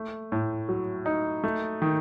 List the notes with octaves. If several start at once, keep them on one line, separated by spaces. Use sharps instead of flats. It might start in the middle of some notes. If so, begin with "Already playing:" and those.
Already playing: A3
A2
F#3
D#4
A3
D#3